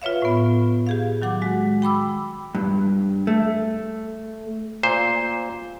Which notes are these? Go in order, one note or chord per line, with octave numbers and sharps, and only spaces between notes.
F4 B4 C#5 E5 F5
A2 B3
G4 G#4 F5
D#3 F#3 F#5 D6
G#3 F#4
G5 B5 D6 E6
G2
A3
A#2 C5